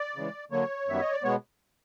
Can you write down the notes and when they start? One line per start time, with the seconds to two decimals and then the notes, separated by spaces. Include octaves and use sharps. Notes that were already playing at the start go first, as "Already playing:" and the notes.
Already playing: D5
0.16 C#3 E3 G#3
0.51 D3 F#3 A#3 C#5
0.87 F#2 D#3 G3 B3 E5
1.01 D#5
1.12 D5
1.23 B2 G#3 B3 C#5